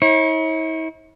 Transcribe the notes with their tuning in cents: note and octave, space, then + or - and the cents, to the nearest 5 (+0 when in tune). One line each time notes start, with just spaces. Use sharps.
E4 -45 C#5 -35